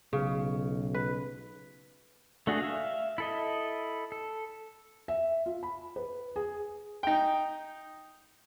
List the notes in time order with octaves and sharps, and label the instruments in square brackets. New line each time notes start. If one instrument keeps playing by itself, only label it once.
[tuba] B1 [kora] C#3
[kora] B4
[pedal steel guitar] A3 D4 F#4 G#4
E5 F5
E4 A4 D#5
A4
[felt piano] E5
F4
B5
B4
G#4
[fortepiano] D#4 G5